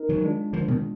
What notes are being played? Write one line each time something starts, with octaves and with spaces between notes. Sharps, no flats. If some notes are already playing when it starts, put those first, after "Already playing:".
Already playing: D#4 A#4
D#3 F#3
G#3 D4 F4
D3 F3
B2 D#3